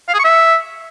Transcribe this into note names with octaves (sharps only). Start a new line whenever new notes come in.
F5
G#4
C#6
E5